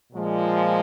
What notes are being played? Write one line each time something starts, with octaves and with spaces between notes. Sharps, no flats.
A#2 F3 G#3